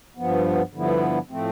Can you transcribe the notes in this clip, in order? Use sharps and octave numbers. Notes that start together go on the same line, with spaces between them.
G2 F3 B3
G2 D3 F3 B3 E4
A2 F3 A3 C4